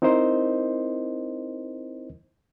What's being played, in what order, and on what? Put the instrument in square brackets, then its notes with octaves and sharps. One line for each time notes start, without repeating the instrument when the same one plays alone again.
[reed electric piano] C4 D#4 E4 A#4 C5 D#5